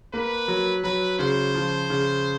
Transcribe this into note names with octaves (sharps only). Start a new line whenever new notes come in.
A#3 B4
F#3
F#3 B4
C#3 C5
F3
C#3